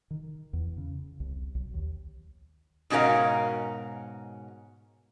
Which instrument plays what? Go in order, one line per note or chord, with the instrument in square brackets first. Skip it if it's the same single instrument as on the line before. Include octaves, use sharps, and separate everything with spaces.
[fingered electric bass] D#3
E2
C#3
C2
B1
D#2
[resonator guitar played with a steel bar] G#2 B2 C#4 F#4 A#4 F5